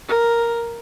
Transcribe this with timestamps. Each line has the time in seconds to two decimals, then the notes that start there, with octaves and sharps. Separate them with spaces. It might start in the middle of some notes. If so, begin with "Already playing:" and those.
0.09 A#4